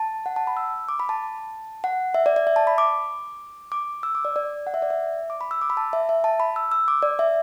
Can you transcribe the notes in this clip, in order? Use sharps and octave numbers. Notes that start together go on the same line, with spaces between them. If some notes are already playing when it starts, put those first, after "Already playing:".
Already playing: A5
F#5
A5
B5
E6
D6
B5
A5
F#5
E5
D5
D5
E5
A5
B5
D6
D6
E6
D6
D5
D5
F#5
E5
D5
E5
D6
B5
E6
D6
B5
A5
E5
E5
A5
B5
E6
E6
D6
D5
E5